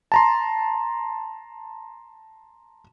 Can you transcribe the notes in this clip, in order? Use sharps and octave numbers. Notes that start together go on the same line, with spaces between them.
A5 A#5 C6